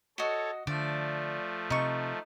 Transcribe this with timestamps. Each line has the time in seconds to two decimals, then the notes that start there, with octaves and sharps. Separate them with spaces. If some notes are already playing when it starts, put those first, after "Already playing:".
0.18 F#4 A4 C#5 D#5
0.67 D3 F3 A3 D5
1.70 C3 D#4 C#6